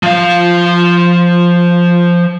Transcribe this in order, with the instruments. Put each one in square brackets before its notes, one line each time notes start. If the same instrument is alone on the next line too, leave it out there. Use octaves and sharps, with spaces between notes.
[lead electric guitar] F3 F5